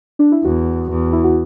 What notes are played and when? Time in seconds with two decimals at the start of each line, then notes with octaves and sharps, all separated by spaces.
0.19 D4
0.32 E4
0.44 E2 F#4
0.89 E2
1.13 E4
1.24 F#4